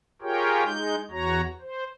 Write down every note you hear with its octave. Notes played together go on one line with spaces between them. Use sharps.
F4 G4 G#4 A#4 C#5 G5
G#3 D#4 G6
E2 F#4 C#5 A#5
C5